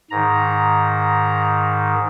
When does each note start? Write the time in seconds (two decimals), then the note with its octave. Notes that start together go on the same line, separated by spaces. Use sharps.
0.11 G#2 D#3 A#5